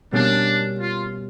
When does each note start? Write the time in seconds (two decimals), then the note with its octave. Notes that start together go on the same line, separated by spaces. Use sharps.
0.12 B2 G3 A#3 C#4 D4
0.80 F4